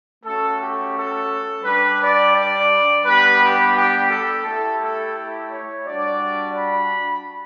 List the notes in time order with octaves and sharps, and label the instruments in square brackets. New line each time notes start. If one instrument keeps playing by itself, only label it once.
[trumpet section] A3 C#4 F#4 A4
G4
A4
G3 D4 G4 B4
D5
D5
G3 B3 D4 G4 B4
G4
G4
A4
A3 E4 G4 A4
A4
C#5
G3 D4 F#4 D5
B5